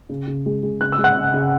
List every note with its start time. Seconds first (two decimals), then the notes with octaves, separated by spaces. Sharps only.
0.09 C#3
0.27 C#3
0.46 G#3
0.63 G#3
0.81 C#3 F#6
0.92 E6
0.98 G#3
1.04 F#5 F#6
1.17 C#3
1.34 C#3